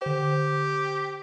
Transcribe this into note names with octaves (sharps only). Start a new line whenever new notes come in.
D3 G4 C5